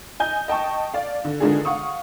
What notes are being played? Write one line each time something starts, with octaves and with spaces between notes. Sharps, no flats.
D#5 G#5 G6
D#5 G5 A5 C#6
D5 F5
D3
D3 D#3 G#3 D4 F4 G#4
F5 F#5 C#6 D#6